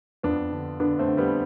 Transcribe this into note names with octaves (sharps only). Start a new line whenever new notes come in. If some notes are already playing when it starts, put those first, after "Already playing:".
F2 B3 D4
D3
D3 B3 D4
A3 C4
D3
G3 B3